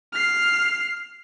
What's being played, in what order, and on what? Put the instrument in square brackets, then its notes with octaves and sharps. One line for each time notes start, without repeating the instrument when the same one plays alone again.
[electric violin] F6 C7